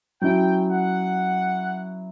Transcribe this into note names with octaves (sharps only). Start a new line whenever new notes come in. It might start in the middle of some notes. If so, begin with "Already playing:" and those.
F#3 C#4 E4 G5
F#5